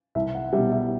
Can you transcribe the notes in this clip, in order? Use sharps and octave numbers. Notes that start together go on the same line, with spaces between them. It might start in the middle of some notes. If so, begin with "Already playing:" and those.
C2 E5
F#5
G3 E5
B2
E5